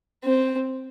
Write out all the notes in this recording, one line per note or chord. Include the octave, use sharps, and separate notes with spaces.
C4